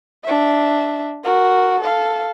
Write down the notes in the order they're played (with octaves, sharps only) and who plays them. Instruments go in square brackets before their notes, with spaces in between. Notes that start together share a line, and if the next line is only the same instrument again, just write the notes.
[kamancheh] D4 E5
F#4 A#4
A4 F5